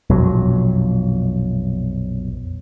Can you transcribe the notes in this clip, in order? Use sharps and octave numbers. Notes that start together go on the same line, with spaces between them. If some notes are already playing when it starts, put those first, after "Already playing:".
A#1 F2 B2 F#3